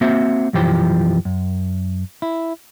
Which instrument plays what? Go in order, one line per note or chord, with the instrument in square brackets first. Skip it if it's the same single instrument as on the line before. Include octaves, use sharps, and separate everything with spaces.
[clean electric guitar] A#3 C4 F#4 C5 E5
B1 F#2 E3 F3 G4 C5
F#2
E4